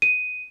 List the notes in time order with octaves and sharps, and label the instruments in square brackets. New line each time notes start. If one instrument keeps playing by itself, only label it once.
[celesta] D#7